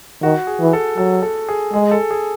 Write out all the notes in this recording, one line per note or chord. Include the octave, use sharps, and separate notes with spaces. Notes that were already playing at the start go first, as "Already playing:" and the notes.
D#3 F#4
G#4
E3
A4
F#3 A4
A4
G#4
G#3 G#4
A4
G#4